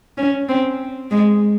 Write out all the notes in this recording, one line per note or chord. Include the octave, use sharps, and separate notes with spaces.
C#4
C4
G#3